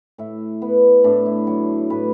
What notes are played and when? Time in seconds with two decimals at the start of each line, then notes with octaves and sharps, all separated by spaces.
0.18 A2 E5
0.62 B3
1.04 A2 D4
1.26 E4
1.47 F#3
1.90 A2 B4